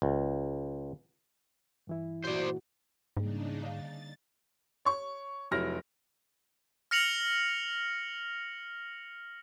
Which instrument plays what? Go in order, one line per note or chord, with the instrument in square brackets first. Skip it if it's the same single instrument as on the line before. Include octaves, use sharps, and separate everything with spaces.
[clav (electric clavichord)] C#2
[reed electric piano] G2 E3 E4
[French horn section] A#2 F#4 [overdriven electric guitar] C5 D5
[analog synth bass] G#2 [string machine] C#3 D4 D#4 [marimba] G3 A#3 G#4
[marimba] D3 F5 [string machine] A6
[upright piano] C#5 C#6
F1 F#3 E4 F6 A#6
[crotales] F6 A#6 C#7 F7 F#7